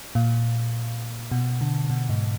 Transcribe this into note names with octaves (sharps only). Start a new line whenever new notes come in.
A#2
B2
D3
B2
G#2